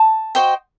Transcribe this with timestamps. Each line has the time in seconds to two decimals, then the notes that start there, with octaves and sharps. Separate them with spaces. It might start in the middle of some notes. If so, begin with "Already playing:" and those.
Already playing: A5
0.35 F#4 C5 D#5 G5